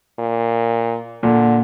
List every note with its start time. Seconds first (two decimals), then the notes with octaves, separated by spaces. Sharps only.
0.19 A#2
1.23 A#2 D3